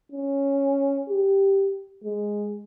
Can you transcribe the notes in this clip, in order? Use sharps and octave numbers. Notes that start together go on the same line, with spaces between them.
C#4
G4
G#3